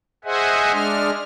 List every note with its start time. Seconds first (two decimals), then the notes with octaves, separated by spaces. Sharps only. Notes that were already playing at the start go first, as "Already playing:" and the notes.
0.24 G#4 C5 D#5 E5 F#5 G#5
0.72 G#3 D4 F6